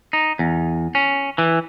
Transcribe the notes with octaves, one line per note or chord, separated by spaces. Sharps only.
D#4
E2
C#4
E3